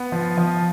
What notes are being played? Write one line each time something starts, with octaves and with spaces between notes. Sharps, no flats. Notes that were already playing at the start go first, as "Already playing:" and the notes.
Already playing: B3
F3
F3